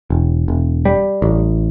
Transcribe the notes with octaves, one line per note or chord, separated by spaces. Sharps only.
E1
E1
G3
A1